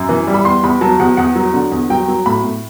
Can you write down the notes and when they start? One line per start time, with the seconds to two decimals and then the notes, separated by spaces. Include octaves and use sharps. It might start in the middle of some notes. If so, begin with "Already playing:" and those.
Already playing: F#2
0.09 E3
0.27 G3
0.34 B5
0.45 E2 C6
0.63 E2 B5
0.81 F#3 A5
0.99 E2 F#5
1.17 E2 F#5
1.36 F#3
1.54 D3
1.72 E2
1.90 F#3 G5
2.08 F#3
2.26 A2 B5
2.44 A2